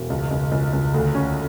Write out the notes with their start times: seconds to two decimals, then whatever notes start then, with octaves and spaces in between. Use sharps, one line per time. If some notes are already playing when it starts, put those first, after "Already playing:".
Already playing: E1
0.10 C#2
0.31 C#2
0.52 C#2
0.73 C#2
0.94 D2
1.14 C#4